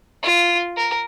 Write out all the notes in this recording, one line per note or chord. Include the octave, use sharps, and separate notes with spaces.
F4
A#4